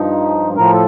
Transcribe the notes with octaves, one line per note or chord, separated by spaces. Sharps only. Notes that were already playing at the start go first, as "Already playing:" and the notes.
Already playing: G2 F3 D#4
A2 F3 A#4
A4